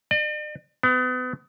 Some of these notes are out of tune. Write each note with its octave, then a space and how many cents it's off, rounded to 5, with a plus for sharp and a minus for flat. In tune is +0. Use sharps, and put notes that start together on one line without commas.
D5 +45
B3 +35